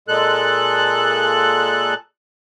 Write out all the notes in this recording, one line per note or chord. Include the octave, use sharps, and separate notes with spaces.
A#2 G#3 A4 F#6